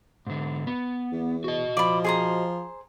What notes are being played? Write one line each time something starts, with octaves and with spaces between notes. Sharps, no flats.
G#2 D3
B3
E2
F#4 D#5
F3 D5 B5
G#4 C5 A#5